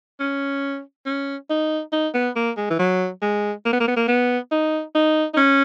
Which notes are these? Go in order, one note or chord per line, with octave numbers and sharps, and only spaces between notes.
C#4
C#4
D#4
D#4
B3
A#3
G#3
E3
F#3
G#3
A#3
B3
A#3
B3
A#3
B3
D#4
D#4
D#4
C#4